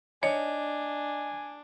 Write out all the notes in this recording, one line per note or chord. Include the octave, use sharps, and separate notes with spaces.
D4 D#4 C#5 G#5